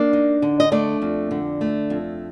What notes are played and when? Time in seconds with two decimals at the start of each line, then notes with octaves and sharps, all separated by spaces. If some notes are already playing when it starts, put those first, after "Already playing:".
Already playing: A#3 D4 D5
0.13 D#4
0.42 D3
0.60 D#5
0.72 A3 D4 D5
1.02 F2
1.31 D3
1.61 A3
1.90 F2